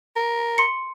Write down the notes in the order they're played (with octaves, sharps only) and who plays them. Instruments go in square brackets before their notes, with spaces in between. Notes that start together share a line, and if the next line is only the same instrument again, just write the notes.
[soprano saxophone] A#4
[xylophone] C6 C#7